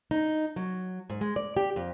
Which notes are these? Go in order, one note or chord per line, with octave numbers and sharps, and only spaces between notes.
D#4
F#3
G#2
G#3
D5
G4
F2